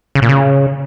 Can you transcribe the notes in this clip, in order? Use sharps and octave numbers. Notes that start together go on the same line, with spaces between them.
C#3
A#2
C#3